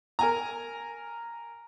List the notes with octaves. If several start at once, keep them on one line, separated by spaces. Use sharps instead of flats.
A#4 G#5 A#5